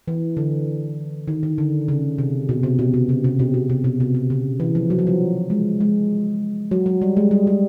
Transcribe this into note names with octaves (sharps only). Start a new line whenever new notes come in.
E3
D3
D#3
D#3
D3
C#3
C3
B2
C3
B2
C3
C#3
C3
B2
B2
C3
B2
C3
C3
C#3
E3
F3
F#3
F3
F#3
G#3
G#3
F#3
F#3
G3
G#3
G3
G3